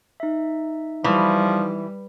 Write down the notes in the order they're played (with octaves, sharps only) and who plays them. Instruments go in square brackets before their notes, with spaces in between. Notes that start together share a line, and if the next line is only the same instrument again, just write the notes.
[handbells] D#4 E5
[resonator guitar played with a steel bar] E3 [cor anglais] F3 [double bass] G3